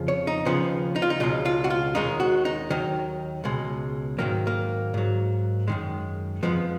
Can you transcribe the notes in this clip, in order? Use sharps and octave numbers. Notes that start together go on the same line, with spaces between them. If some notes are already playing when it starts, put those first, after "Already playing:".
Already playing: F2 C#3 F3
C#5
D#4
D#2 C#3 F3 B3
D#4
F4
D#4
C#2 B2 G#3 F4
F4
F#4
F4
D#2 D#3 G#3 D#4
F#4
D#4
D#2 D#3 F#3
C#2 B2 G#3
G#2 D#3 F#3 A#3
A#3
G#2 F#3
F#2 D#3 G#3
F2 F3 G#3 B3